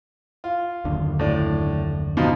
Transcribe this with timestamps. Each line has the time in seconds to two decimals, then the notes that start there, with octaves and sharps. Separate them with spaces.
0.44 F4
0.85 F#1 D#2 D3
1.19 A2 D4
2.17 B2 F3 D#4